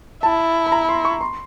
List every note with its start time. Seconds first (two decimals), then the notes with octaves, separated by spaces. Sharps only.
0.23 E4 A5
0.67 B5
0.72 A#5
0.89 C6
1.05 C#6
1.21 C6